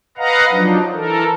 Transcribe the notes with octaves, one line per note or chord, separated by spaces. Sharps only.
B4 D#5 F5 F#5 A#5
F3 F#3 D4 D#4
E3 A4 A#4